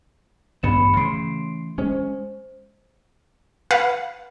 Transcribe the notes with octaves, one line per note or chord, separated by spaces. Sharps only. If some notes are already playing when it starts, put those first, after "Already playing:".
A1 G2 B3 B5 C#7 E7
C#3 E3 A3 C6 C7 D7
G#3 C#4 C5
B4 F5 F#5